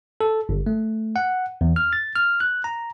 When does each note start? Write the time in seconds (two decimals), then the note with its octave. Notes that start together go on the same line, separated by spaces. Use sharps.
0.21 A4
0.49 G1
0.66 A3
1.16 F#5
1.61 E2
1.76 F6
1.93 A6
2.16 F6
2.40 F#6
2.64 A#5